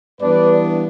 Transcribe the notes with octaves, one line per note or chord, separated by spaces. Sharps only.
G2 E3 B3 D4 B4 D5